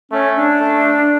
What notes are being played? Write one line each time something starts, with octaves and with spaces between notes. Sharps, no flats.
A3 C#4
D4
A3